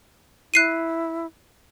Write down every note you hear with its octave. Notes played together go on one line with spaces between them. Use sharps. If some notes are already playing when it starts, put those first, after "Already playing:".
E4 F#6 C7 D#7